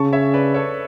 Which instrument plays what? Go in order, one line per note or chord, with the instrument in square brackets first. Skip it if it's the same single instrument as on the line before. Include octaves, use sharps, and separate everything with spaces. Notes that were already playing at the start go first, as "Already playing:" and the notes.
Already playing: [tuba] C#3 [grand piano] A5 C#6
[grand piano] C#5 E5
B4 D5
A4 C#5